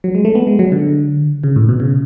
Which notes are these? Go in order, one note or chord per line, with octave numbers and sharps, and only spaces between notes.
F#3
G#3
A3
B3
G#3
F#3
D3
C#3
A2
B2
C#3